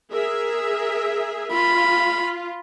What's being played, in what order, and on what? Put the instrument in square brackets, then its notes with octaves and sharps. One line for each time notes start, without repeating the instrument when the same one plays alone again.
[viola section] G#4 A#4 E5
[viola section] F4 [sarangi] B5